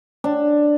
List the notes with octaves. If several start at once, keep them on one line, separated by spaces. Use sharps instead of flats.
D4